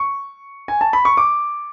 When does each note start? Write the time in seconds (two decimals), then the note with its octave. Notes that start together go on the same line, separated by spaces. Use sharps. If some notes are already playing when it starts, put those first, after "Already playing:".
Already playing: C#6
0.68 G#5
0.81 A5
0.93 B5
1.05 C#6
1.17 D6